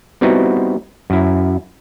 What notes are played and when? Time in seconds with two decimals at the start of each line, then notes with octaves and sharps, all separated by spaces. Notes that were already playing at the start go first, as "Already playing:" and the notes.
0.21 G3 B3 C4 D#4 E4 F#4
1.10 F#2 E4